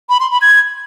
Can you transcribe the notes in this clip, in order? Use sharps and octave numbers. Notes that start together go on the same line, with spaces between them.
B5
C6
B5
G#6